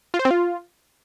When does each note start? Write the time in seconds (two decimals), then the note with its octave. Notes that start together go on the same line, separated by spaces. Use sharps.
0.14 F4
0.19 C5
0.25 C4
0.31 F4